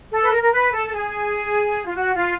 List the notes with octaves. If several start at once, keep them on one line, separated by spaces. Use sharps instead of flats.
A4
B4
A#4
A#4
B4
A4
A4
G#4
F4
F#4
F4